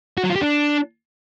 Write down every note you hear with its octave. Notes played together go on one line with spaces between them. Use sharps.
F#4
F#3
F4
G4
D4